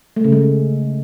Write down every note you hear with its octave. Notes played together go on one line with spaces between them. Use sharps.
A3
C#3
G#3